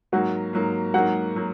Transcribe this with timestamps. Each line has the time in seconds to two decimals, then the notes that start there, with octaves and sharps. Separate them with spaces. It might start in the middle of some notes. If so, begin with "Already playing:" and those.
0.12 G#2 F#3 A#3 F#4 F#5
0.53 G#2 F#3 A#3
0.94 G#2 F#3 A#3 F#4 F#5
1.36 F#3 A#3